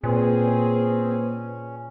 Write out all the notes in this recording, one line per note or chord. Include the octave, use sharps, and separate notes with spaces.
A#2 A#3 C4 C#4 G#4 B4 C5